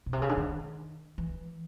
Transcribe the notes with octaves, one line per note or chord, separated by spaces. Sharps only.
B2
C3
C#3
D3
D#3
E3